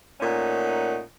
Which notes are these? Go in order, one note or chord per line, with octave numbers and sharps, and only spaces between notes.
A#2 A3 C#4 D#4 F#5